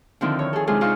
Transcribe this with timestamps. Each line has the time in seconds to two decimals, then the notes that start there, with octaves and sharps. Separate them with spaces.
0.21 D3 D#3 F3 C4 E4 F4
0.39 C#5
0.53 G#4 A4
0.67 C3 G#3 D4 D#4 F4 G#4
0.81 D#4 F4 C5 F5 C#6